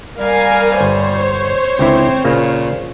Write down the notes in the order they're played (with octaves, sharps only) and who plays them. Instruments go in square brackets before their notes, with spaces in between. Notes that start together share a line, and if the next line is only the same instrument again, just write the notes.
[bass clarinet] G3 [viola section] A#4 F5 G#5
[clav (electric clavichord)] G1 [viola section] C5 C#5
[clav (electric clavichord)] C#2 D3 E4 [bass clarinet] C4
[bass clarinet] A#2 [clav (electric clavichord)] C#3 A#3